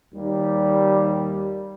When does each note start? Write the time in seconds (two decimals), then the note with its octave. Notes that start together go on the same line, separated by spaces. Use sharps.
0.13 D#2 G3